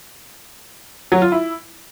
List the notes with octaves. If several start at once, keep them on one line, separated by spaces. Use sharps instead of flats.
F#3
F4
E4